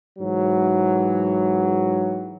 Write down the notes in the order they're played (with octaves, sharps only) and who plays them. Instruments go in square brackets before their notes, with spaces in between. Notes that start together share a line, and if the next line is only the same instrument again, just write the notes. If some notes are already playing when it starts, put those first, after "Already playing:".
[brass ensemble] G#2 E3 F#3